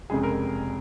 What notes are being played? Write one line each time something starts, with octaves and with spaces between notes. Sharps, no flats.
F1 F2 C#3 G#3 G#4
A#4